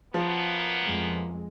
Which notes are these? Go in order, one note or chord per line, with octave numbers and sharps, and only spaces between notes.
F#2 F3 A#3 B3
F2 G#3